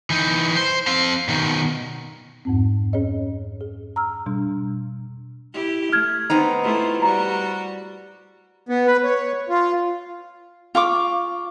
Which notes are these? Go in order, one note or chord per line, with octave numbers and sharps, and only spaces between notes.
E3 D#4
C5
C4 F5
B2 D#3
F2 G#2 C4
C#4 G#4 C#5 D#5
G#4
A#5 E6 F6
B2 G3 D4
E4 G4
A3 F6 G#6
B3 C4 D#4
A3 E4 F4
G3 F#4 A#5
B3
B4
C#5
F4
F4 C#6 D6